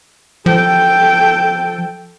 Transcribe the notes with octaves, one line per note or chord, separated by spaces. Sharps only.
F3 A4 G5